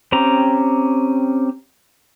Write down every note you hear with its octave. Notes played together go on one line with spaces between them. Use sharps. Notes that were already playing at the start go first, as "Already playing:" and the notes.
C4 C#4 G4 A#5